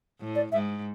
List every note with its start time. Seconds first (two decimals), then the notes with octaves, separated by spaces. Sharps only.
0.19 A2
0.36 D5
0.52 G#2 E5